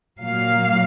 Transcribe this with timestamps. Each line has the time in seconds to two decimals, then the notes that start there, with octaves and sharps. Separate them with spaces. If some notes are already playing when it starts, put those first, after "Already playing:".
0.20 A#2 F#3 A#3 F5